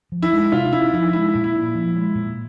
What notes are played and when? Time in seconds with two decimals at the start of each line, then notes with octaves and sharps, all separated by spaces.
0.12 F3
0.22 E4
0.33 G#3
0.52 C3 F4
0.72 C#4 E4
0.93 F3 E4
1.13 G#3 E4
1.35 A#2
1.44 E4
1.55 A#2
1.75 F3
1.96 G#3
2.15 A#2